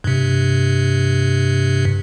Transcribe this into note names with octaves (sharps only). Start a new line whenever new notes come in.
G2 C3